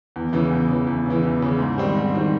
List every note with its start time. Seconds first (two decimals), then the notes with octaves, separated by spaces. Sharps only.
0.16 E2
0.33 C#3 E3
0.51 E2
0.69 C#3 E3
0.87 E2
1.06 C#3 E3
1.23 E2
1.42 C#3 E3
1.59 G#2
1.78 D#3 G3 C4
1.96 G#2
2.14 D#3 G3 C4